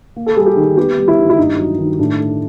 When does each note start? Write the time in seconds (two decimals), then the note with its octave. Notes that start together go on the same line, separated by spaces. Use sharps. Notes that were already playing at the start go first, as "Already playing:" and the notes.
0.16 A#3
0.26 A4
0.36 G3 G#4
0.46 G4
0.57 D#3
0.77 B3 G4
0.98 G3
1.08 E4
1.17 D#3
1.30 E4
1.37 G2 D#4
1.58 F#3
1.79 D#3
1.99 A2 D4
2.19 A3